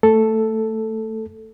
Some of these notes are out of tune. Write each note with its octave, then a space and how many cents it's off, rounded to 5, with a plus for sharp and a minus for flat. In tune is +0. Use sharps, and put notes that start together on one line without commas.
A3 +15 A4 +0